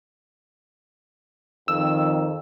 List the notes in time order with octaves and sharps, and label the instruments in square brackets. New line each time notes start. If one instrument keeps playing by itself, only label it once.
[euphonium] F2 [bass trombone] D#3 [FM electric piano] E6